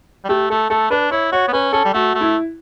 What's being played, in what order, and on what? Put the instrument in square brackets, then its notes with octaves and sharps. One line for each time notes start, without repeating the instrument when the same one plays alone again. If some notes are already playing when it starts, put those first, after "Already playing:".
[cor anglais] G3
[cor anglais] A3 [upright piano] G4
[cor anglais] A3 [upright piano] A4
[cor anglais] A3 [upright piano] A4
[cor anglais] D4 [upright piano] B4
[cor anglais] E4 [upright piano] C#5
[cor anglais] F#4 [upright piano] C#5
[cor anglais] B3
[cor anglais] C#4 [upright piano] B4
[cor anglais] C#4 [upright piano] A4
[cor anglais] G3
[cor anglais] A3 [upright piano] F#4
[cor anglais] A3
[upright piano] E4